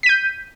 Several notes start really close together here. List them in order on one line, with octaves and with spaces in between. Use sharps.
B6 D#7 G6